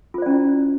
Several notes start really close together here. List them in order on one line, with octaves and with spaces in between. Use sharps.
F4 C5 D5 C#4 E4